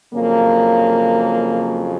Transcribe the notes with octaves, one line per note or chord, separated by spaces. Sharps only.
F2 C#3 F#3 A#3